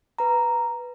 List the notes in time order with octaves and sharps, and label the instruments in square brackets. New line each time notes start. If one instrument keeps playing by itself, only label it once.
[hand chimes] B4 A#5